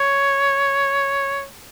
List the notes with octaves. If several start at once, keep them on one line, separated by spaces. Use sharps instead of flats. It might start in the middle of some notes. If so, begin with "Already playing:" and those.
Already playing: C#5